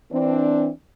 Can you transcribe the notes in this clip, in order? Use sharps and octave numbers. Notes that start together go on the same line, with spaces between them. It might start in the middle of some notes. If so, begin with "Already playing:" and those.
E3 C4 D4